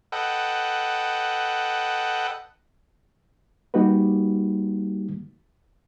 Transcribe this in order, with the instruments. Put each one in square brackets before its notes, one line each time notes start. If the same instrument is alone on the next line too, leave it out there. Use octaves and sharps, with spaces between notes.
[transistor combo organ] A4 B4 D#5 F#5 G5
[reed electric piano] G3 A#3 D#4 F#4 G4 B4